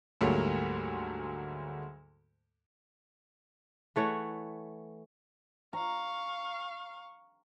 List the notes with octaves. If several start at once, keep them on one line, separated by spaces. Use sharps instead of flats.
D2 G#2 F#3 G3 A3 A#3
E3 A3 C#5 F#5
F5 A#5 C#6